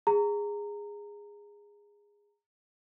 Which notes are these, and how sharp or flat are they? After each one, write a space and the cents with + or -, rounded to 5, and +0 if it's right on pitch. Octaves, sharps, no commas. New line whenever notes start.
G#4 -15 A#5 -20